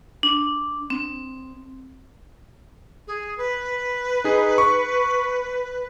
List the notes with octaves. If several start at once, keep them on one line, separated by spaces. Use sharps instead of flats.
D4
C4
G#4
B4
D#4 G#4
C#6